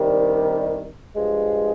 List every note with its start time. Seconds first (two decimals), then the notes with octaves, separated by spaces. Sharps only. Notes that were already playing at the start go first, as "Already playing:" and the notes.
Already playing: C2 C3 D#3 G3 D4
1.15 G2 F3 G#3